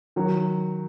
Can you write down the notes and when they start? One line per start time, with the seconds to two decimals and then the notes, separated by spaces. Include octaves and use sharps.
0.16 D#3 F#3